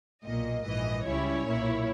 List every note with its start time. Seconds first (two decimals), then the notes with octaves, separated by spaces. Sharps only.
0.24 B1 A#2 A#3 D#5
0.65 A#1 G#2 E3 D#5
1.05 C#2 C#3 G3 C#4 E4 C#5
1.47 B1 A#2 A#3 E4